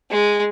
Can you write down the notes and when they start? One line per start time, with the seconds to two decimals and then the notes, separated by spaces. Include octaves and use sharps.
0.11 G#3